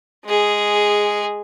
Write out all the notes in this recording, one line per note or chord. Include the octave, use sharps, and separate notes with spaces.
G#3 G#4